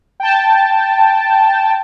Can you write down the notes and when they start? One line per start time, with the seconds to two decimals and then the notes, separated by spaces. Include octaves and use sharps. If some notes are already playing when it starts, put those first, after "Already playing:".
0.20 G5 A5